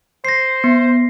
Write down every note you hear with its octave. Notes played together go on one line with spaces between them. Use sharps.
C5 A#6 C7
B3